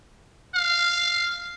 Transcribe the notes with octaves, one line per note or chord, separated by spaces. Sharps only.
F5